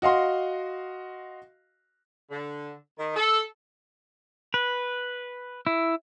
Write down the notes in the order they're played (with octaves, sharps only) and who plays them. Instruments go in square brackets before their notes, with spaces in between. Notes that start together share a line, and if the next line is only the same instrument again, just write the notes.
[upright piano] F#4 D#5 F5 C6
[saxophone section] D3
D#3
A4
[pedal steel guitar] B4
E4